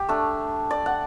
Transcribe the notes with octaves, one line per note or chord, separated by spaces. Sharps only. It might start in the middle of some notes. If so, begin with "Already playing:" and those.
Already playing: G4
A3 D4
D5
F#5